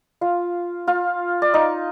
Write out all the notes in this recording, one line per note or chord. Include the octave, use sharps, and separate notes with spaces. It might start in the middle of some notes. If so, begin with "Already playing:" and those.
F4 F5
F4 F5
D5
D#4 D#5